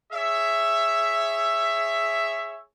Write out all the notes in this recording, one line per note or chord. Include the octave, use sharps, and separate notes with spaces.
G#4 C#5 E5